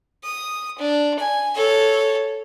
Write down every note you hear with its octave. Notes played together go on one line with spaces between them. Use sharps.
D#6
D4
G#5
A4 C#5